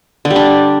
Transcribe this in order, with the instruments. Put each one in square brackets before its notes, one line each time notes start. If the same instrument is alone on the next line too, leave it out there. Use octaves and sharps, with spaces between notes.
[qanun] D3
G3
D4